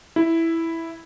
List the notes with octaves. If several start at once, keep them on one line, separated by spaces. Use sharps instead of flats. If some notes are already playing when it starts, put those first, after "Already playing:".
E4